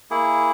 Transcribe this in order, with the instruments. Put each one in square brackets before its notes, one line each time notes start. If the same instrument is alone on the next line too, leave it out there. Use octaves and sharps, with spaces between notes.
[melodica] A#3 E4 G#4